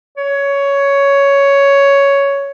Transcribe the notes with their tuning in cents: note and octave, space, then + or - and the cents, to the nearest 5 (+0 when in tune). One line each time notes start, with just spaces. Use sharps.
C#5 +10